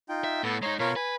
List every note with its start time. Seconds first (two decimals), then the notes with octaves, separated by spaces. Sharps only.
0.09 D#4 F4 G5
0.24 E5
0.43 A2 B3 A4 A5
0.62 G#3 D#4 C#5 A#5
0.80 B2 F4 A#4 C#5
0.96 B4 G#5